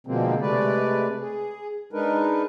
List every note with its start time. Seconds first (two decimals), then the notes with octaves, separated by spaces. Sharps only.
0.07 B2 D3 F3 G#3 A#3 C4
0.41 C3 G#3 A3 B4 D5
1.19 G#4
1.93 G#3 D4 D#4 A#4 B4